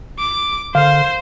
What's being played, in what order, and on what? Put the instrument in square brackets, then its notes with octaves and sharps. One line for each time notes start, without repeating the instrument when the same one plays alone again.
[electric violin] D6
[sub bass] D3 [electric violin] C5 [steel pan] F5